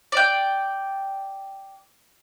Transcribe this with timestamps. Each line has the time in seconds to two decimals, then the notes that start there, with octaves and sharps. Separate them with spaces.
0.12 D5 G5